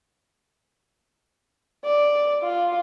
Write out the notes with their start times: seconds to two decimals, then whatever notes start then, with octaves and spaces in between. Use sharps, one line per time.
1.85 D5
2.43 F4